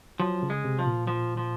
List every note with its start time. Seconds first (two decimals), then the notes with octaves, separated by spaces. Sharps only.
0.19 F3 F#3
0.43 C#3
0.50 G#3
0.64 C3
0.79 F3
0.86 A#2
1.07 F3
1.37 F3